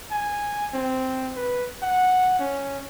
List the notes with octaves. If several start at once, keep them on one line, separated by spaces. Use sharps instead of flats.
G#5
C4
B4
F#5
C#4